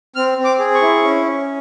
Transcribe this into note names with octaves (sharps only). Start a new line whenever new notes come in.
C4 F6
C4
D6
G#4
C#6
E4
C#4
C#4